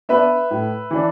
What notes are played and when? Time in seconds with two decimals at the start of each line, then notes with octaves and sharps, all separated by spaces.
0.09 B3 D4 B4 E5
0.51 A2
0.91 E3 D4